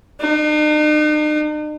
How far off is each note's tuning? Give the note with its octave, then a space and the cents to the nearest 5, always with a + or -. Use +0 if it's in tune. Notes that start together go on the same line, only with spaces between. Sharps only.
D#4 -45